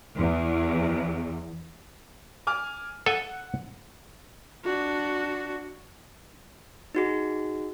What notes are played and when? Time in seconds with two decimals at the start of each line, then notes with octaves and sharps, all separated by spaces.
0.17 E2
2.47 G#5 D6 F6
3.06 A4 F#5 G#5
4.65 D4 F#4
6.95 D#4 F#4 G#4